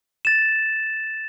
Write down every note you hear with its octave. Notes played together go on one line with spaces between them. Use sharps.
A6 E7